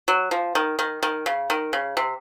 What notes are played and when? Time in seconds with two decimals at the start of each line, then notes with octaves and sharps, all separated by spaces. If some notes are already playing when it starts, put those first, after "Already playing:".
0.08 F#3
0.31 F3
0.55 D#3
0.79 D#3
1.03 D#3
1.26 C#3
1.50 D#3
1.73 C#3
1.97 C3